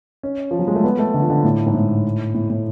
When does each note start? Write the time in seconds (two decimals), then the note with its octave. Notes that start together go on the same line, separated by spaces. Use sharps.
0.23 C#4
0.51 F3
0.59 F#3
0.67 G#3
0.75 A3
0.84 B3
0.99 A3
1.14 D3
1.22 F3
1.30 D3
1.44 A2
1.66 G#2
1.74 A2
2.34 A2
2.50 A2